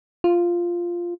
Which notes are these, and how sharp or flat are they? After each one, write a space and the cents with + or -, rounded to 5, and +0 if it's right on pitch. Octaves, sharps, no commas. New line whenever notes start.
F4 -5